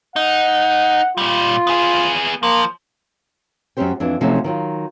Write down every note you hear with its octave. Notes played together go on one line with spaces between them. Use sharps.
D#4 F#5
A#2 G3 F4
B3 G#4
F3 A#3
F#2 E3 C#4 G4 C5 G5
F2 E3 D4
C3 F3 F#3 A3 C#4 D#4
D#3 F#3 F4